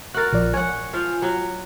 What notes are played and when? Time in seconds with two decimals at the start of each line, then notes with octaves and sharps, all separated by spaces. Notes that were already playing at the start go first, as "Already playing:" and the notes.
0.14 F#4 A#4 F#6 A6
0.33 A#1 F3 D5
0.54 C#5 F#5 G#5
0.93 F3 F5
1.22 F#3